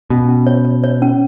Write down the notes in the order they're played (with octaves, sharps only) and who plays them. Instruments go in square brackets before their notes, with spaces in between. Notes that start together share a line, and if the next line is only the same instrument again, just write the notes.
[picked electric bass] B2 [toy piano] C#4
[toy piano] C#4
C#5
C#5
C#5
C#4